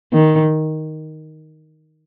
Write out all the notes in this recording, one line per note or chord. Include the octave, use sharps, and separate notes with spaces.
D#3